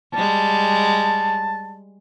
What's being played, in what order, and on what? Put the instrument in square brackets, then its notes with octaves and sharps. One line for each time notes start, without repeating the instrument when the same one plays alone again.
[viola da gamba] G3 G#3 [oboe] A5